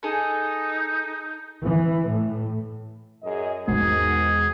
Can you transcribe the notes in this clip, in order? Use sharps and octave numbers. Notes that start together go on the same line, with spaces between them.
D#4 G#4 A4
E3
A2
F#2 G#4 D#5
E2 G#2 B2 D#3 D#4 F#4 G#4